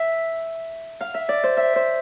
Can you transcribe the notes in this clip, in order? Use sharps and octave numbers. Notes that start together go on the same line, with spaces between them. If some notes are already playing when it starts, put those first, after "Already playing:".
Already playing: E5
F5
E5
D5
C5
E5
C5